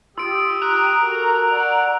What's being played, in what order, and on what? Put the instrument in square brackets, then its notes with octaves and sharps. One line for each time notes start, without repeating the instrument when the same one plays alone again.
[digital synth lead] F4 [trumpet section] G4 D#6 [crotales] E6 D7
[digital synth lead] A#5 [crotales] F#6
[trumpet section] F#4 A4 A#4
D5 F#5